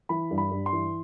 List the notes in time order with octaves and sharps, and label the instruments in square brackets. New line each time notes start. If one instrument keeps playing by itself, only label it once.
[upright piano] E3 B5
G2
B5
G2
C6
E3